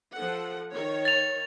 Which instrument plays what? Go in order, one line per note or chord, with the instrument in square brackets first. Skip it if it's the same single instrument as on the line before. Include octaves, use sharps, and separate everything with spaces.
[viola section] F3 A4 F#5
D#3 C#5
[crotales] A6 F7